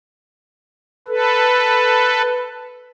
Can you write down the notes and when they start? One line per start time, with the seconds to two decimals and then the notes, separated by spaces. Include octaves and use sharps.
1.08 A4 B4